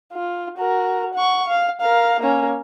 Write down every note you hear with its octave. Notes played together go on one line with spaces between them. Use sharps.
F4
F#4 A#4
F#5 C#6
F5
A#4 F5
A#3 C#4